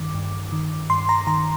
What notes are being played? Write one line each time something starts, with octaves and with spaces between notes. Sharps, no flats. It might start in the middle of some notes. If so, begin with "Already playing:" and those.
Already playing: G2 D#3 D6
G2
D#3
G2 C6
A#5
D#3 A#5